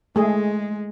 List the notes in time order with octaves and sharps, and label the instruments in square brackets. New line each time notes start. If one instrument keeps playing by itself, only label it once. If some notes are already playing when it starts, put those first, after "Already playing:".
[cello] G#3 [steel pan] A3 G#4